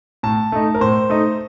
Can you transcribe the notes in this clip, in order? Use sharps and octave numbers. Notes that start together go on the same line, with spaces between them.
A2 A5
A3 D#4
A#4
A2 C5
A3 D#4